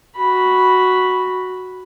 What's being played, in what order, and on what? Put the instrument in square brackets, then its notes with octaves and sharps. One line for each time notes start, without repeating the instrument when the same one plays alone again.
[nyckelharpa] F#4 B5